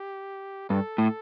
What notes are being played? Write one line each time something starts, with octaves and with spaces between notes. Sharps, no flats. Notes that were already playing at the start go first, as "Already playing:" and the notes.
Already playing: G4
G2 A4
A2